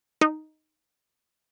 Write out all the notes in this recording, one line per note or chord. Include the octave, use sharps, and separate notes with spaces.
D#4